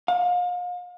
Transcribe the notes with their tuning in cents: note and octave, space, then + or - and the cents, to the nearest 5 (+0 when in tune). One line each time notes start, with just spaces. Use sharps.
F5 +35